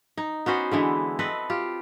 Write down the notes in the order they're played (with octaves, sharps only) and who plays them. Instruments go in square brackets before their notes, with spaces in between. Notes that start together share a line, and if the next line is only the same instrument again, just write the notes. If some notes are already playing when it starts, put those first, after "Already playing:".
[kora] D#4
B3 C#4 F#4 C5
D3 E3 G#3 E4
C4 A4 B4 D#5
F4 G4